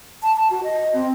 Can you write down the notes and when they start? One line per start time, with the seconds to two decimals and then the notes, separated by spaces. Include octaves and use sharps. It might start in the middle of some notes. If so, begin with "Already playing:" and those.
0.23 A5
0.36 A5
0.50 F#4
0.64 D#5
0.94 C4